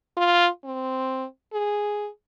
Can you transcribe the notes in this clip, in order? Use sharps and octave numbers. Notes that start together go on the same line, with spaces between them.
F4
C4
G#4